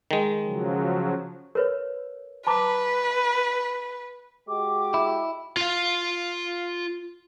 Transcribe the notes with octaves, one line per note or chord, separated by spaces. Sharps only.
D#3 G#3
C#3 F3 F#3
A#4 B4 C#5
B4 A5 A#5 D6
G#3 F#4 G4 D6
E4
F4 F5